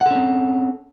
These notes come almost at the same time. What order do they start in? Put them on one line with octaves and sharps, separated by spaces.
F#5 A4 C#4 C4